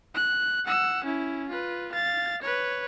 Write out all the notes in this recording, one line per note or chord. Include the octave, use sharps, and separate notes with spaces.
F#6
F#5 E6
C#4 E4
F4 B4
F5 A6
B4 C#5